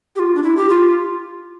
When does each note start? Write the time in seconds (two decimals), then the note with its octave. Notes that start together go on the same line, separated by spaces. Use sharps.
0.16 G4
0.19 F4
0.35 D4
0.43 E4
0.57 G4
0.69 F4